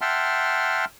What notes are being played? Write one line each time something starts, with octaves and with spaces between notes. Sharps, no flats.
E5 F#5 G5 A5 C6 F6